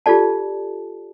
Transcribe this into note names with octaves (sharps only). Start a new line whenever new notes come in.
F4 G4 A4 D5 A5